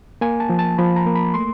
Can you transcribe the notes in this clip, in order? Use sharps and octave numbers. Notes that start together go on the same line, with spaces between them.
A#3 G#5
A5
F3
A5
F3 B5
A#5
A#3
B5
A3 C6